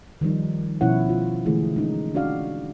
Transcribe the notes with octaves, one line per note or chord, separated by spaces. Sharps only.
D#3 F3 G3 D#4
B2 F3 C#4 E4 C#5 F#5
F4
D3 E3 G#3 A3 E4 G#4
G#3 C#4 D#4
C#4 D4 F#4 D5 F5